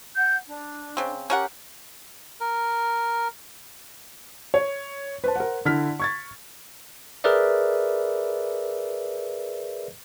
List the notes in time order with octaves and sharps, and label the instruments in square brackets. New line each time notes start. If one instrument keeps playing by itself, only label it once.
[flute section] F#5 G6
D4
[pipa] C#3 C4
[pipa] C#4 A#4 F#5 [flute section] G4
[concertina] A#4
[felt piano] C#5
B4 C5 A5
A#4 C5 F#5
D3 E4 F6 B6
C#6 G#6 A6
[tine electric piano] G#4 A#4 B4 D5 E5